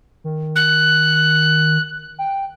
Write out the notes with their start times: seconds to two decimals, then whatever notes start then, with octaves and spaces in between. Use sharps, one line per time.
0.24 D#3
0.56 F#6
2.19 G5